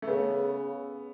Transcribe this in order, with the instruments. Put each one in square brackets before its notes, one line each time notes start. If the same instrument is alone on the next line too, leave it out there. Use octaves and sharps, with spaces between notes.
[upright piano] A3
[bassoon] C#3 [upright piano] B3